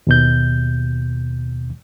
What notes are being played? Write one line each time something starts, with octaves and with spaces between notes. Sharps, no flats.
D#2 B2 G6